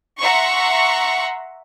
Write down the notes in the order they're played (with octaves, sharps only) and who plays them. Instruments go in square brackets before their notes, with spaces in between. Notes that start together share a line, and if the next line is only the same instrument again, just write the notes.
[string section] E5 F#5 A#5 C6 C#6